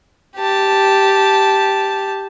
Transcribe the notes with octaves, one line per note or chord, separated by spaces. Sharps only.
G4 A5